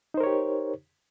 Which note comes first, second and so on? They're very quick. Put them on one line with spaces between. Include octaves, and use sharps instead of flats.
D#4 C5 A#4 C#5 G4